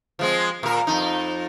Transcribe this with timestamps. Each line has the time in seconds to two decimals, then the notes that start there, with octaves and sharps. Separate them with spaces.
0.19 F3 G#3 C4
0.63 A#2 A#4
0.87 F2 D#4